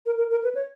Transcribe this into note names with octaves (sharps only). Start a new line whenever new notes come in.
A#4
A#4
A#4
B4
C#5